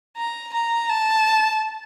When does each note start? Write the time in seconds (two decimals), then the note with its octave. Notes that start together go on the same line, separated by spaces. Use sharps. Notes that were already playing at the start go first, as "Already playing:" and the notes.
0.17 A#5
0.54 A#5
0.90 A5